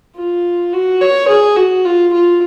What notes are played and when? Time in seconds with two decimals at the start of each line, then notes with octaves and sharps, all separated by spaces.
0.16 F4
0.73 F#4
1.01 C#5
1.28 G#4
1.56 F#4
1.85 F4
2.13 F4